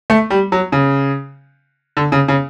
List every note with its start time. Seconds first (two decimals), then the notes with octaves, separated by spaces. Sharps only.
0.10 A3
0.30 G3
0.52 F#3
0.72 C#3
1.97 D3
2.12 C#3
2.28 C#3